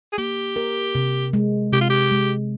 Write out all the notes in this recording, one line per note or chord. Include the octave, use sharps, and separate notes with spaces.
G#4
A#3 G4
A#4
C3
G#3
C3 G4
F4
G4
G#3